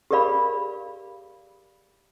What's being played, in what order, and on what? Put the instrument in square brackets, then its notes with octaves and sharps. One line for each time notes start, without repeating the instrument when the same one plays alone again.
[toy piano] G4 G#4 A#4 D5 F5 B5